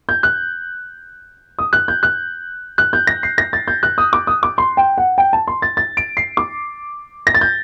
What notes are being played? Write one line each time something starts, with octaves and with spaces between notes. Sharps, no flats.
G6
F#6
D#6
F#6
G6
F#6
F#6
G6
A#6
C7
A#6
A6
G6
F#6
D#6
D6
D#6
D6
C6
G5
F#5
G5
A5
C6
A6
A6
D7
C7
D6
A#6
A6
G6